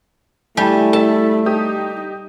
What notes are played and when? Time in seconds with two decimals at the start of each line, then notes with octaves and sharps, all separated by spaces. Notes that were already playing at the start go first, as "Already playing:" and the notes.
0.57 G3 A3 E4 G#5 A5
0.93 A4 E5 A5
1.46 D#4 G4 D#6